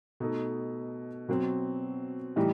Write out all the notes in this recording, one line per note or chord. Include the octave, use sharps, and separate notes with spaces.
B2 A3 D#4 A4
B2 F#3 C4
A2 E3 G3 D#4 G4